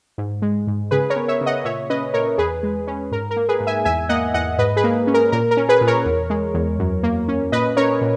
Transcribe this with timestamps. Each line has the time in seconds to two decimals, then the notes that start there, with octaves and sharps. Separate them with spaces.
0.18 G#2
0.42 G#3
0.67 G#2
0.91 C#3 G#4 B4
1.10 A#4 C#5
1.16 B3
1.28 C#5 E5
1.41 C#3
1.46 D#5 F#5
1.65 A#2 C#5 E5
1.90 C#4 B4 D#5
2.14 A#2 A#4 C#5
2.38 E2 G#4 B4
2.63 G#3
2.87 C#4
3.12 G#2 A#4
3.31 A#4
3.36 A#3
3.49 G#4 B4
3.60 G#2
3.67 E5 G#5
3.85 E2 E5 G#5
4.09 A#3 D#5 F#5
4.34 E2 D#5 F#5
4.58 G#2 B4 D#5
4.76 G#4 B4
4.84 A#3
5.07 C#4
5.14 A#4
5.32 A#2 A#4
5.51 A#4
5.57 C#4
5.69 G#4 B4
5.81 A#2
5.87 A#4 C#5
6.06 E2
6.30 G#3
6.54 E2
6.79 F#2
7.03 A#3
7.28 C#4
7.52 A#2 B4 D#5
7.77 C#4 A#4 C#5
8.01 A#2